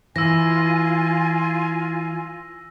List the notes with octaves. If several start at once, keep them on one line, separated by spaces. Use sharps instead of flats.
E3 F4 G#5 E6 A#6